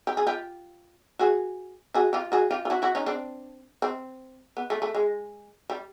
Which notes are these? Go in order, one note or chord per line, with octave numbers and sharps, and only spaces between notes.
G4
G#4
F4 G4
F#4 G#4
F#4 G#4
F4 G4
F#4 G#4
F4 G4
F4
E4 F#4
E4 F#4
C#4 D#4
C4 D4
C4
B3
A3
A3
G#3
G3